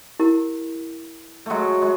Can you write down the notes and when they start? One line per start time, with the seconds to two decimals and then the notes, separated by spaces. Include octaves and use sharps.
0.20 E4 G4 A#4
1.46 F#3 G#3 A3
1.82 G#3